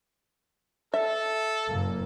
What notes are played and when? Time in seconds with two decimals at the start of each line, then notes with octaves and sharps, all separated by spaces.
0.94 A4 E5
1.69 F#1 A#3